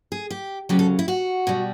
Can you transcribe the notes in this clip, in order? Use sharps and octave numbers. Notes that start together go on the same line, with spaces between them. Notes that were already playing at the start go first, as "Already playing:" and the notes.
G#4
G4
D2 C#3 F#3 G4
A4
E4
F#4
B2 G3